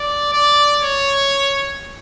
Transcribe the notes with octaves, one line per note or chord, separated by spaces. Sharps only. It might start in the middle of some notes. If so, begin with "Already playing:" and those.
Already playing: D5
D5
C#5